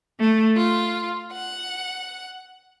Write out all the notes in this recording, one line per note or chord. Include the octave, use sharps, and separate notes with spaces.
A3
F4
F#5